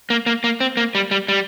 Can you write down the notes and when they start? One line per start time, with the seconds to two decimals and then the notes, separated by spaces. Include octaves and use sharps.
0.10 A#3
0.26 A#3
0.44 A#3
0.60 C4
0.77 A#3
0.95 G3
1.11 G3
1.29 G3